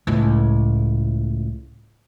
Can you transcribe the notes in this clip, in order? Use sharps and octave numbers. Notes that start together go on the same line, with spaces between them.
C#2 A2